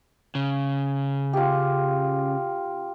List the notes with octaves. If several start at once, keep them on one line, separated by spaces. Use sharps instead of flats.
C#3
F4 G4